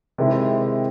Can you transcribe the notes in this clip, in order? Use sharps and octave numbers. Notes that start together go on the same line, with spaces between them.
C3 D#3 G#3 C4 E4